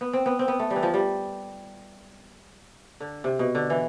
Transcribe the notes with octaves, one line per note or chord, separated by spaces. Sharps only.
B3
C4
B3
C4
B3
A3
G3
E3
F3
G3
D3
C3
B2
D3
E3